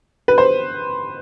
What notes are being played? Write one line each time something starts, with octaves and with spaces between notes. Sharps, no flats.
B4
C5